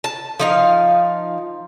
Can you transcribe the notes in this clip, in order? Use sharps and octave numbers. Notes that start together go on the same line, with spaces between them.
A5
F3 D#4 F5